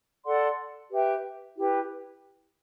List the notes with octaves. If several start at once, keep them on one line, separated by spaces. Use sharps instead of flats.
A4 D5 F#5 C6
G4 B4 E5 G5
E4 G4 B4